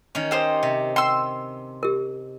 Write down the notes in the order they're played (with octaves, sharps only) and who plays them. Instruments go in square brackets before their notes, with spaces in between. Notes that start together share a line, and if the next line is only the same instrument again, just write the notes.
[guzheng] D#3 C#4
[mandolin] G4 C5 D#5
[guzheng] C3
[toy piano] G5 [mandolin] C6 E6
[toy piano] G4 A#4